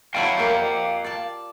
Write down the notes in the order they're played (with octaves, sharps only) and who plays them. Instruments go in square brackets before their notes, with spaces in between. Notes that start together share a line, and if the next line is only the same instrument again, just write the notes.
[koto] F#3 E4 D5 [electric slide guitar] F5 G5
[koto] A#3 F4 G4
D5 A5